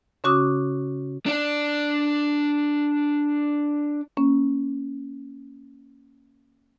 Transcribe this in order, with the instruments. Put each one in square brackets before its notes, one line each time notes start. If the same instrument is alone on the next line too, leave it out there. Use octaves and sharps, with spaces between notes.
[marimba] C#3 C#4 F#4 D6 D#6
[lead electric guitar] D4 D5
[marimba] A#3 C#4